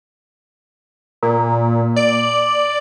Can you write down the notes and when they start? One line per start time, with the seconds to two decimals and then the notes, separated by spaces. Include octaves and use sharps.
1.23 A#2
1.96 D5